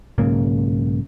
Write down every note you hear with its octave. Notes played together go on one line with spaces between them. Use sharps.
B1 G#2 C#3 A#3